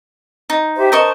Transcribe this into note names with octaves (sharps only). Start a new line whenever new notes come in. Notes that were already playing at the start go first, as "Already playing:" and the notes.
D#4
G4 C5 E5
D4 A#4 C5 D#5 A5 C#6